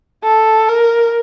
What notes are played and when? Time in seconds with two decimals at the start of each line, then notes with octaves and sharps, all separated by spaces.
0.24 A4
0.69 A#4